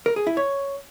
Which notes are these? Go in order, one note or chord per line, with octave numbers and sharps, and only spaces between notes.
A#4
G#4
E4
C#5